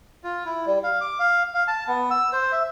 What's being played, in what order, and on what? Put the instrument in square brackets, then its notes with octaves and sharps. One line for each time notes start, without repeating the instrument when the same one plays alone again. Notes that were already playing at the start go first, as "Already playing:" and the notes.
[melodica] F4
E4
G3
F5
D6
F5
F5
A5
B3
E6
C5
E5